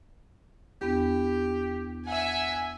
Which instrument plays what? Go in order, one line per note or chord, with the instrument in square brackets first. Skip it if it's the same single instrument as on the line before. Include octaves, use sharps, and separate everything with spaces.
[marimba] E2 B3 D4 [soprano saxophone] G4
[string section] E5 G#5 [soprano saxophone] F#5